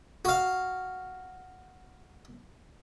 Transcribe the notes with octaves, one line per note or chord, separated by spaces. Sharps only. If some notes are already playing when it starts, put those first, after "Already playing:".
F#4 F5